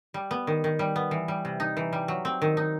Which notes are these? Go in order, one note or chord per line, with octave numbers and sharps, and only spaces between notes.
G3
B3
D#3
D#3
G3
B3
E3
G3
C3
D#4
E3
G3
F#3
C4
D#3
D#4